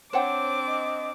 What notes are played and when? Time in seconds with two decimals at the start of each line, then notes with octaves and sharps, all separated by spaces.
0.13 C4 D4 C5 C#5 F#5 G5 D6
0.67 D#5